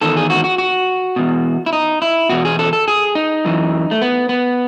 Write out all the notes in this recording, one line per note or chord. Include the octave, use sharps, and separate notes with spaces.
E2 D#3 A4
G#4
F#4
F#4
F#4
E2 B2
E4
D#4
E4
E2 B2 F#4
G#4
A4
A4
G#4
D#4
F#2 E3
A3
B3
B3